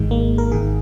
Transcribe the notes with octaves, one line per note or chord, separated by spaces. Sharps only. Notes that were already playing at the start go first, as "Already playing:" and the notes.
Already playing: G#1 G#2 D#3 G#3
A#3
A#4
G#1 G#2 D#3 G#4